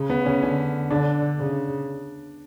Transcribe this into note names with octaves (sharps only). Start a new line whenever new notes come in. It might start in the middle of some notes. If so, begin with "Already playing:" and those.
Already playing: C#3
B3
C#4
D3 C#4
D3 D4
C#3